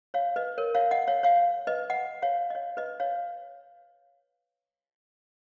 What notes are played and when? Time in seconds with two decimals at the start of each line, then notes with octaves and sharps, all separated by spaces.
0.14 C#5 F5
0.36 B4 D#5
0.58 A#4 C#5
0.75 C#5 F5
0.91 D#5 F#5
1.08 C#5 F5
1.23 C#5 F5
1.67 B4 D#5
1.90 D#5 F#5
2.22 C#5 F5
2.50 D#5
2.55 C#5 F5
2.77 B4 D#5
3.00 C#5 F5